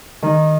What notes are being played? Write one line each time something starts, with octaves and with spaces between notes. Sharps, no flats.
D#3